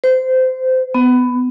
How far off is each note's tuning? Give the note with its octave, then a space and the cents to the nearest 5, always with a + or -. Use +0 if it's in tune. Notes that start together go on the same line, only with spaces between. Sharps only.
C5 -20
B3 +15